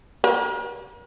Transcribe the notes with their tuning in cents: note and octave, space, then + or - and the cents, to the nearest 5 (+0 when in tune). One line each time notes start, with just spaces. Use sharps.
A#4 +40